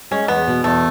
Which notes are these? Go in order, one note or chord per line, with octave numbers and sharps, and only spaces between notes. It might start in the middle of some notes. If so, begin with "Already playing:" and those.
G#3 C#4
E2 B3
B2
E2 A3